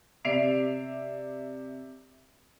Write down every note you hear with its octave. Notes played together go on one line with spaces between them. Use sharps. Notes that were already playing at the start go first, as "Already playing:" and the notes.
C3 D5 E5 C7 D7 F7